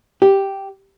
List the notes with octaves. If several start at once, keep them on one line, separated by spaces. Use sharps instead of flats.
G4